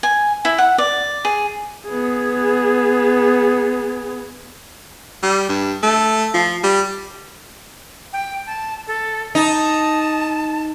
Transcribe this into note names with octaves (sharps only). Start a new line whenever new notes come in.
G#5
E4
F#5
D5
G#4
B3 G#4
G3
G2
A3
F3
G3
G5
A5
A4
D#4 A5